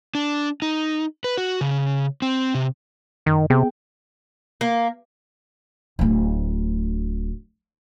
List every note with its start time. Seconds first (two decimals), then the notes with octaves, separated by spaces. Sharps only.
0.15 D4
0.62 D#4
1.24 B4
1.37 F#4
1.61 C#3
2.22 C4
2.55 C3
3.26 F#2 D#3
3.50 C3 B3 G#4 G5
4.61 A#3
5.99 D1 D2